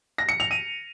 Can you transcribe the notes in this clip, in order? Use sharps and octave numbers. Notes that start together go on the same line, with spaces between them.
A#6
C#7
F7
D#7